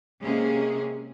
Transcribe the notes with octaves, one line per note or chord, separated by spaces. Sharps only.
C3 G#3 A#3 C#4 G#4